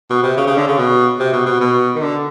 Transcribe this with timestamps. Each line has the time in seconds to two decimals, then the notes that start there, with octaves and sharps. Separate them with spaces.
0.10 B2
0.23 C3
0.37 C#3
0.47 C#3
0.57 D3
0.68 C#3
0.78 B2
1.20 C3
1.33 B2
1.46 B2
1.60 B2
1.95 D#3
2.01 D3